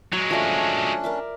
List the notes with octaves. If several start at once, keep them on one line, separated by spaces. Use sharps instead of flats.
F#3 G#3 F#4
F3 A3 C#4 D4
A#4 D5 E5